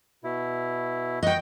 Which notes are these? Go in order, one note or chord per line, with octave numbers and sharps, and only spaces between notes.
B2 E4
D#5 F#5 G5 C#6 F#6